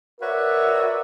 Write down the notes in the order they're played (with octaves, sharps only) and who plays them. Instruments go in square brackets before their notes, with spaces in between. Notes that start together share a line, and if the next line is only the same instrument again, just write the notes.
[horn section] F#4 A#4 B4 C#5 D5 E5